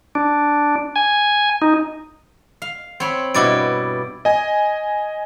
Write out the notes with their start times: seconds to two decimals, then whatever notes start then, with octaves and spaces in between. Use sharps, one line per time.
0.15 D4
0.96 G#5
1.62 D#4
2.62 F5
3.00 C4 C#5 B5
3.34 G2 B2 E4 D6 A6 D7
4.25 D#5 G#5